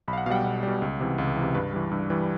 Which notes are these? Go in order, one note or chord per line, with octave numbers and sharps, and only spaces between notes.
B1 B5
F5
F#5
B2 G3 F5 F#5 G5
B1 F#5
B2 G3
C#2
C3 E3
C#2
C3 E3
G2 B4
E3 G3
G2
E3 G3